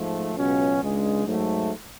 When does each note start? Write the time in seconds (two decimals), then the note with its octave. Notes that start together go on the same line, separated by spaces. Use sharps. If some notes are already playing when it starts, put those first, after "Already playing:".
Already playing: G#2 F3 A3
0.34 C#2 B2 F#3 C#4 F4
0.80 C#2 C#3 G#3 D4
1.26 G#2 F#3 A3